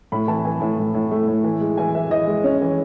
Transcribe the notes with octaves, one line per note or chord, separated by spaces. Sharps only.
A2 B5
E3 A5
E3 G#5
A2
A2
A2
A3
A2
E3
G#3
E3 G#5
E3 E5
E3 D#5
G#3
C#4
E3